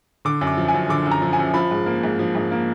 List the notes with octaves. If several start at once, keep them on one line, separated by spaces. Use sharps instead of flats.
D3 D6
F#2
D6
F3
G#5
F#2
D3 D6
F#2
A#5
F3
G#5
F#2
F3 B5
G#2
A#3
G#2
F3
G#2
A#3